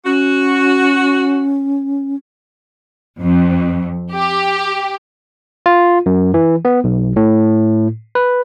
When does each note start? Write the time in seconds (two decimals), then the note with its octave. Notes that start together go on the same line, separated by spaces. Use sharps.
0.05 C#4 F#4
3.21 F2
4.13 G4
5.66 F4
6.06 F#2
6.34 E3
6.65 B3
6.84 B1
7.16 A2
8.15 B4